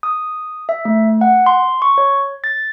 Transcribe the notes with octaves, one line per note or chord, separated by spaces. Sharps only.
D#6
E5
A3
F#5
C6
C#6
C#5
A6